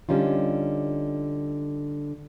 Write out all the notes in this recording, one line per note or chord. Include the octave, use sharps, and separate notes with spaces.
D3 G3 C#4 D#4 F4